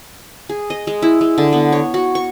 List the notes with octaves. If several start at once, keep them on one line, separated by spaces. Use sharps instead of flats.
G#4
D#5
G#3
E4
G#3
D3
B3
C#5
F#4
C#6